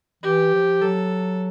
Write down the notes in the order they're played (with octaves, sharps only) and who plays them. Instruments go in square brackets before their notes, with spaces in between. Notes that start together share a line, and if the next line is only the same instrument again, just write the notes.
[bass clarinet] E3 [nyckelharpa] G4
[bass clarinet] F3
[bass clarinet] F#3 [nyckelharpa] A4